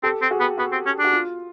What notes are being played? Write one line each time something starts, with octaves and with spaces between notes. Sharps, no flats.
C4 G4 A4
C4
F#4 G#4
B3
B3 F#4
C4
C#4
D4
F#4
F4